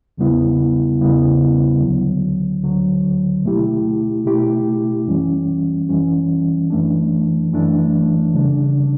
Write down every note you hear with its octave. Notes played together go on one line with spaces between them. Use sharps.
E2 C#3 G3 B3 E4
E2 C#3 G3 B3 E4
D2 D3 F#3
D2 D3 F#3
B2 A3 E4 G4
B2 A3 E4 G4
F#2 E3 G3 C#4
F#2 E3 G3 C#4
F#2 E3 A3 D4
F#2 E3 A3 D4
C#3 G3 D4